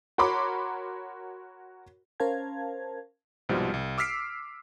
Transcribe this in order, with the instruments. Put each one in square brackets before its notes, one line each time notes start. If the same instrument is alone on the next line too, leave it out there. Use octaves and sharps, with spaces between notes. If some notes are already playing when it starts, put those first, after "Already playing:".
[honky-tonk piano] F#4 A#4 C#5 B5 C6 D6
[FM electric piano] C#4 A#4 C5 F5 A5 G#6
[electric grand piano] C2 G#2 B2 F3 G3
C2
D6 E6 F6 B6 C7 D7